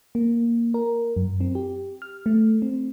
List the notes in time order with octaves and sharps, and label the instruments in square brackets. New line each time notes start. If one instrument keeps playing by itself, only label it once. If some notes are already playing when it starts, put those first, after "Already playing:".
[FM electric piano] A#3
A#4
F#2
C4
G4
F6
A3
C4